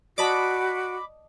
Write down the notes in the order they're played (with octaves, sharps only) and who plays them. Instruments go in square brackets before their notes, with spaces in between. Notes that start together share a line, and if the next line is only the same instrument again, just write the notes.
[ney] F#4 [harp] D5 D#5 A5 [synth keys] B5 D6